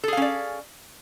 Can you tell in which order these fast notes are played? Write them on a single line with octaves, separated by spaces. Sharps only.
A4 G#4 F5 C#4 D5